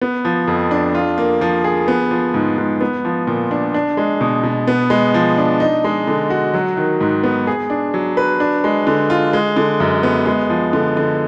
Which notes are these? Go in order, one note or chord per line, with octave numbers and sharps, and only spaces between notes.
B3
F3
F2
D4
F4
A#3
F3
G#4
B3
F3
G#2
G#2
B3
F3
A#2
D4
D4
G#3
B2
B2
B3
G#3
F3
D4
D#4
G#3
D3
F#4
F#3
D#3
G#2
B3
G#4
D4
F#3
B4
D4
G#3
D3
F4
G#3
D3
F#2
B3
G#3
F3
D3
D3